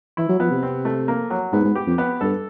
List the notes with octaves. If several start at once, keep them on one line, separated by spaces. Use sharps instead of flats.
E3 E4
F#3
F3 B3
C3
C4
A3
A#3
F#3
G#2 B3
G#2
G4
F2
B3
G2 A4